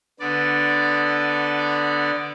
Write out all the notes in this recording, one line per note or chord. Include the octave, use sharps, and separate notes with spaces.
D3 B3 D5